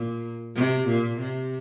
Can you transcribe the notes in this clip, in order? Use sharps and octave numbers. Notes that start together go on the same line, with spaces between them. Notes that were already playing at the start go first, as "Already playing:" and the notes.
Already playing: A#2
C3
A#2
C3